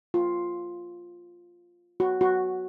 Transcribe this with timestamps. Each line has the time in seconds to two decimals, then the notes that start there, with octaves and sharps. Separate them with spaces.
0.14 F4
2.00 F#4
2.21 F#4